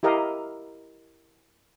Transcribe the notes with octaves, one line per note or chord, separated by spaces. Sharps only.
E4 G4 A#4 D#5 F5